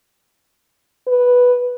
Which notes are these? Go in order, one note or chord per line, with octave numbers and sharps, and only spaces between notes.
B4